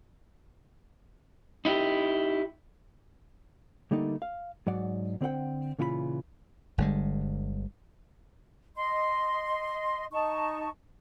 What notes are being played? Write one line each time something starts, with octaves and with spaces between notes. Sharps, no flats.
D#4 E4 G4
D3 G3 A3 A#3 D#4
F5
G#2 F#3 D5 F#5
D3 C4 A#4 F#5 G5
A#2 C#3 E3 F4 G#4 B5
G1 D3 G3 G#3
D#5 C6
D#4 A5 C#6